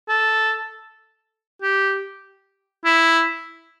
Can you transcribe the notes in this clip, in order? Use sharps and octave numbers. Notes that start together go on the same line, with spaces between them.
A4
G4
E4